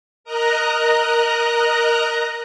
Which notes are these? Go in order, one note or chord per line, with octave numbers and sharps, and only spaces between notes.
A#4 D#5 A#5 F#6